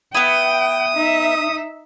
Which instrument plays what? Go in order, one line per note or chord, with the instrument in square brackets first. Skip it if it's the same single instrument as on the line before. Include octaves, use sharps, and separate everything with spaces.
[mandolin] B3 E4 [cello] G5 [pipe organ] D#6
[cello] D#4 E5